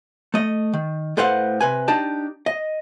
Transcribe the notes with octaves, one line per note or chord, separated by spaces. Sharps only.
A3 D#5
D#3
A2 A4 B4 C5 F5 F#5
C3 B4 G#5
D4 D#4 G4 A5
D#5